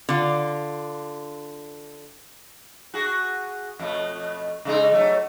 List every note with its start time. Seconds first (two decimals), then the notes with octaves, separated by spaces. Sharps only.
0.09 D3 F4
2.94 F#4 G#4
3.79 F2 B2 A3
4.65 C#3 G#3 D#4
4.92 F#3 A3